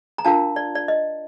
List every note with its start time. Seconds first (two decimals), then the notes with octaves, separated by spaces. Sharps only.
0.18 A#5
0.25 D4 F4 A#4 F5 A5
0.56 D5
0.75 D5
0.88 D#5